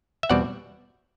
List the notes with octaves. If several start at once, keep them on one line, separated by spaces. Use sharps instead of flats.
E5
E2 B2 G3 C4 D5 F#5